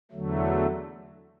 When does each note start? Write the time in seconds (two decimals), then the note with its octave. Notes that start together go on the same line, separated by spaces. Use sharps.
0.11 E2 D3 F#3 A3